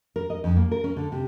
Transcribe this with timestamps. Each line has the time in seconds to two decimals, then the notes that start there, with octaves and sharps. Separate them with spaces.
0.16 A#4
0.30 D#5
0.44 F2
0.57 A#3
0.71 A#4
0.84 C#4
0.96 D3
1.12 C3